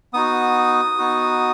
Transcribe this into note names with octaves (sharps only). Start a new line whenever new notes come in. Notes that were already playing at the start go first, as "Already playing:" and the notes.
B3 D#4 F#4 D#6
B3 D#4 F#4